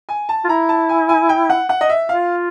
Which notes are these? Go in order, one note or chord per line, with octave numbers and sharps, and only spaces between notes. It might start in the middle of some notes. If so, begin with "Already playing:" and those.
G#5
A5
F4
E4 A#5
A5
G#5
G#5
G5
F#5
F#5
D#5
E5
F4 F5